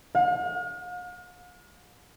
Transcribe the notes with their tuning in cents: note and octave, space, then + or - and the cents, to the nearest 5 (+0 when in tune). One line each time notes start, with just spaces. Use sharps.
F5 +45